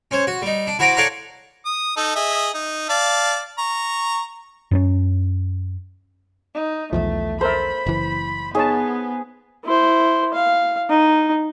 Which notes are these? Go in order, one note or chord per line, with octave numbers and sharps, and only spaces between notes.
C#4 C5 C#5
F#4
G3 D#4
D4
E4 F#4 C5 A#5 B5 D6
A4 C#5 D5 F5 F#5 A#5
D#6
D#4 A4
G#4 D#5 E5
D#4
D5 F5 A5
A#5 C#6
F#2 C4 C#4
D#4
B1 E2 F3 A3
A4 A#4 C5 E5 B5
F#1 E3
B3 D#4 G#4 C#5 A5
E4 C5
F5
D#4